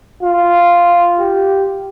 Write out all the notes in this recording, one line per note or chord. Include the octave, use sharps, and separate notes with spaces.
F4
G4